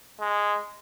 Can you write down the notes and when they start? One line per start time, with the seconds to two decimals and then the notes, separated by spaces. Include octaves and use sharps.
0.21 G#3